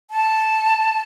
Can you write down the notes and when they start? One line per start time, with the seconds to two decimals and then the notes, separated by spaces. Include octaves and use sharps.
0.11 A5